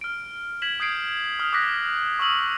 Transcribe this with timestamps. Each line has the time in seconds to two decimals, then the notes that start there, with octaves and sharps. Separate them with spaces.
0.01 F6 D7
0.62 G#6 B6 E7 F#7
0.80 D#6 G6 G#6 C7 D7
1.39 D#6 F6
1.53 D6 D#6 F#6 A#6 B6
2.19 C#6 D#6 E6 F#7